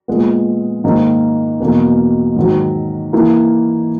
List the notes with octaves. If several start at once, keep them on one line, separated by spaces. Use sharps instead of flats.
A#2 G#3 B3
G#2 D#3 A#3 D#4
E2 B2 F#3 A#3
G#2 D#3 F#3
E3 A#3 E4